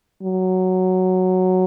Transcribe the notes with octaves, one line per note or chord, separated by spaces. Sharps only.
F#3